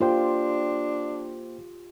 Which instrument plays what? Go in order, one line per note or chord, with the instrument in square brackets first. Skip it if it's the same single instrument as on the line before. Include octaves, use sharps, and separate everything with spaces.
[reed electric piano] A#3 C5 G5 [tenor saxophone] D4 [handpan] F4 G4